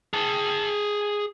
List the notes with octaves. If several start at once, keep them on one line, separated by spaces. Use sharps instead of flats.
G#4 A5